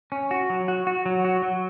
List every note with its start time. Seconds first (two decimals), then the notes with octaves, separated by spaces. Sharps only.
0.12 C#4
0.31 F#4
0.50 F#3
0.68 F#4
0.87 F#4
1.06 F#3
1.25 F#4
1.42 F#3